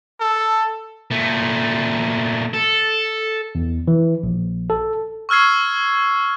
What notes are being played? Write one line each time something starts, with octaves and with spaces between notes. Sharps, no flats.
A4
A#2 A3
A4
E2
E3
A#1
A4
C#6 E6 F6 G#6 C7